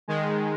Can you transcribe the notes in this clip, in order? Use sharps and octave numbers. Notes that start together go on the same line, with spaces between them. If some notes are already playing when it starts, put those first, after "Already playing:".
D#3 G#3